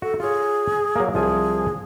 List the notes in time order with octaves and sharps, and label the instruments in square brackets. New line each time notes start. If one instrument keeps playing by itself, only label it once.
[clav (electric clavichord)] F#4 [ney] A4
[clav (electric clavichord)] F4 C#5 [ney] G#4
[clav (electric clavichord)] F#3 A#3
[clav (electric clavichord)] C2 F3 G#5 [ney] G#4